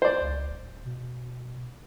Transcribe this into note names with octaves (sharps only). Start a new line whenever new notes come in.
C5 D5
C#2
D1
B2